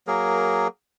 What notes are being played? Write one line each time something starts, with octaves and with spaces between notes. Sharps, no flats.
F#3 A#3 G#4 A#4